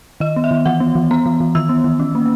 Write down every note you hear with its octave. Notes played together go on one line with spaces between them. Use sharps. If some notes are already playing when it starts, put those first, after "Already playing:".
D#3 D#5
B3
E5
D#3
E3 F#5
B3
E3
B3 A#5
E3
E3
D#3 E6
B3
D#3
C#4
A#3